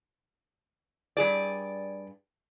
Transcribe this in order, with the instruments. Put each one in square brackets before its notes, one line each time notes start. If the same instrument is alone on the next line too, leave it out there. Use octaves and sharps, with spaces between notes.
[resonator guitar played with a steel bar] G2 G#4 D5